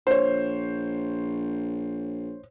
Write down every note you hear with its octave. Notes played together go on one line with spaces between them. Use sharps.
A#1 C5 C#5